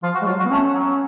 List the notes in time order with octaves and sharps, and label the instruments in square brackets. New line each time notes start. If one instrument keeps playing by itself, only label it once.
[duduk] F3 [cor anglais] F4
[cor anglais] F#4
[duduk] G#3
[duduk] F#3 [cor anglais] F4
[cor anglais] F#4
[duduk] B3
[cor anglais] A3 [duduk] C#4
[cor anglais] F#3